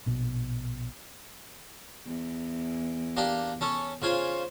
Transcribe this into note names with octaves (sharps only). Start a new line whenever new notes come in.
A#1 B2
E2
A#3 D4 G4
C#4 A4
C#3 F4 C5 G#5